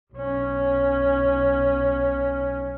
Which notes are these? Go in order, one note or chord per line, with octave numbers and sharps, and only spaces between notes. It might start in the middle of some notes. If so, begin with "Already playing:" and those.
B1 C#4